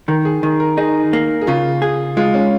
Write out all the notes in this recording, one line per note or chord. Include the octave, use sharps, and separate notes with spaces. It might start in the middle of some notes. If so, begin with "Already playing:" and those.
D#3 A#4
G#4
D#3 A#4
A#4
D#4 G#4
A#3
G#4
C#3 F4
G#4
G#3 F4
C#4